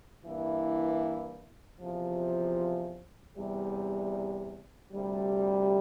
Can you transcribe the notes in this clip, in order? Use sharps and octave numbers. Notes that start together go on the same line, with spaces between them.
G2 E3 A#3 E4
E2 C3 F3
E2 C3 G3
D2 C3 G3